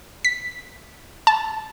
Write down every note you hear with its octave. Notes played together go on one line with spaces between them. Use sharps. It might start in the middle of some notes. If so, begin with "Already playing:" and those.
B6
A5